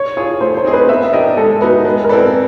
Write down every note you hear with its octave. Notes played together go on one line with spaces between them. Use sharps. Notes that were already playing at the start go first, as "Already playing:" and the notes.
Already playing: C#5
F4 G#4 C#5
A3 C5
C5
C4 D#4 G#4
B4
B3 E5
E5
D4 G4 A#4 D#5
G#3 A4
B3 D#4 F#4 B4
G#3 B4
A#4
C4 E4 A4 B4 D5